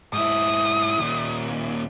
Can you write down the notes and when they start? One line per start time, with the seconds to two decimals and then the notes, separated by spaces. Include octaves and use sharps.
0.13 G#2 E4 D#6
0.98 D#2 A#2